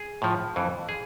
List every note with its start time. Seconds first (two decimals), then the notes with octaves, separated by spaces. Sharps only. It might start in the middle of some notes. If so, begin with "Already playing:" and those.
Already playing: G#4
0.22 A2 F3
0.56 F2 E3
0.89 G#4